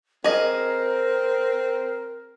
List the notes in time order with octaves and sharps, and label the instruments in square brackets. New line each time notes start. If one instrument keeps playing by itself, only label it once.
[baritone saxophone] C4 [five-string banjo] G#4 D#5 [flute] A#4